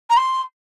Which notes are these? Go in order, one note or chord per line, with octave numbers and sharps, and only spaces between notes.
A#5
C6